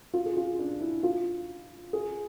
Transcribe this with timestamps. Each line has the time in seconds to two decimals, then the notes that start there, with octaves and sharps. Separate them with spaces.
0.13 F4
0.26 G#4
0.37 F4
0.59 D4
0.81 E4
1.03 F4
1.93 G#4